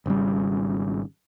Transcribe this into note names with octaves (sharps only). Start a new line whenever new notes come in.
G#1 C#3 G3